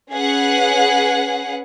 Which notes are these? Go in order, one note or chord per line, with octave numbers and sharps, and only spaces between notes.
C#4 G#4 B4 F#5